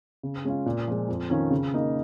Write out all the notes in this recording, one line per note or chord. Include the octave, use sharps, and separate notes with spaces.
C#3
G#3 C#4 F4
A#2
F3 G#3
F2
D#3 C#4 F4
C#3
A#3 D#4